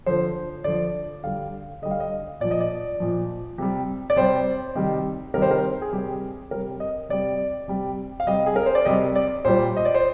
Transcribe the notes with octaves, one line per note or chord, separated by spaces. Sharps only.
D3 F3 C5
D3 F3 D5
D3 G3 F5
D3 G3 D#5
F5
D#5
A#2 F3 D5
D#5
D5
A#2 F3
C3 G3
D5
C3 G3 C5
C3 D#3 G3
C3 D#3 G3 A#4
C5
A#4
G#4
C3 G3 G4
C3 G3 A#4
D#5
C3 G3 D5
C3 G3
F5
C3 G3 D#5
G#4
A#4
C5
D5
C3 G3 D#5
D5
A#2 G3 C5
D#5
D5
C5